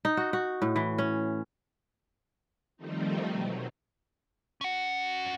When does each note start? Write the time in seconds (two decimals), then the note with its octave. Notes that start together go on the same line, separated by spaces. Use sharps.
0.05 D#4
0.17 F#4
0.33 F#4
0.62 A2
0.76 E3
0.98 C#4
2.77 D#3 F3 G3 A3 C4 D#4
3.31 B2 F#3
4.61 C#4 F#5